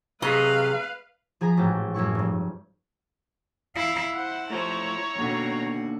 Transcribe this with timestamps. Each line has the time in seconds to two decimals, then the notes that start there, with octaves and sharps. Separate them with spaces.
0.22 C3 F#3 G#4 B4 D#5 F5
1.41 F3 G#4 G#5 A#5 B6
1.57 A1 G#2 F#4 G5 A6
1.94 F#2 A2 E4 C#6
2.15 F1 G2
3.75 E4 F5
4.14 E4 C5 F#5
4.50 A2 F3 C5 C#5 A#5
5.18 D#2 B2 D3 F#4